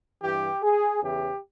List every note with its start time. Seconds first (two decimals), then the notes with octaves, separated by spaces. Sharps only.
0.23 G2 E3 G4
0.63 G#4
1.03 E2 C#3 E3 G4